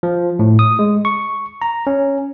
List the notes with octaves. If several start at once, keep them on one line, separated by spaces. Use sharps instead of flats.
F3
A2
D#6
G#3
C#6
A#5
C#4